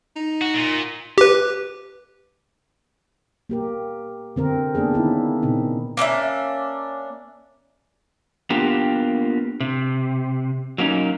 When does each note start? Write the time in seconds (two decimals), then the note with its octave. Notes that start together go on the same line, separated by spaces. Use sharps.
0.16 D#4
0.41 F#4
0.54 A#2
1.18 G4 B4
3.49 A#3 G4 A#4
4.36 D3 C4 A#4
4.75 A#3 B3 D4 G#4
4.94 D#3 A#3 B3 C#4 D#4 E4
5.43 A#2 C#3 C4 D#4
5.97 A#3 C#4 D4 E5
8.50 A#3 B3 D4 F4 G4
9.60 C3
10.78 F#3 A#3 C#4 D#4